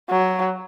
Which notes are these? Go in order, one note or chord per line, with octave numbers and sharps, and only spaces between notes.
F#3